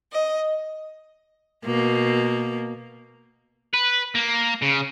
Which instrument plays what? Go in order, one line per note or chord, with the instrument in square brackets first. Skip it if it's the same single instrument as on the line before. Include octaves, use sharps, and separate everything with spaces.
[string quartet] D#5
[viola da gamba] B2 A#3
[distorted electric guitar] B4
A#3
C#3